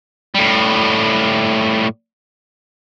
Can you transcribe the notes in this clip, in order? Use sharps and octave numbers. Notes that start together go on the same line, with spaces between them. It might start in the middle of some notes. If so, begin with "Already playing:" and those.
A2 G3